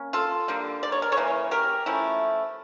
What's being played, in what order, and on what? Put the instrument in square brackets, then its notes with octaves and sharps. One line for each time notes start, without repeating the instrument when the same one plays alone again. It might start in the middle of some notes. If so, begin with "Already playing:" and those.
Already playing: [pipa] A#3 C#4
F4 A4
D3 G3 A#3
D5
C#5
A#4
A4 C#5
C#3 E3 A#3 C#4
G4 A#4
F3 A3 C#4 E4